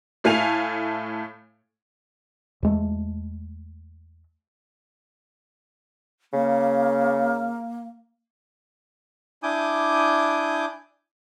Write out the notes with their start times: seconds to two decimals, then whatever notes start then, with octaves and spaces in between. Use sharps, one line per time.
0.24 A2 A3 F5 G#5 F7
2.63 E2 G#3 A3
6.33 C#3 A#3
9.43 D4 E4 G#5 D6 D#6 G6